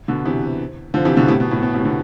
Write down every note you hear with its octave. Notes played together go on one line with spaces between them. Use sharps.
B2 D3
C3 E3
D3 F3
C3 E3
B2 D3
A2 C3
B2
A2
B2
A2 C3
B2 D3